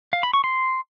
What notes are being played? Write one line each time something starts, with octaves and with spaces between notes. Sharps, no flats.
F5
B5
C#6
C6